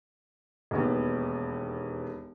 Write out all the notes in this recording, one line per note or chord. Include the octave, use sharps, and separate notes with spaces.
E1 D#2 B3